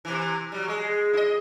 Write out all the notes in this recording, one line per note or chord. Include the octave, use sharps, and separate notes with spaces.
C3 E3
F#3 G3
G#3
E4 D#5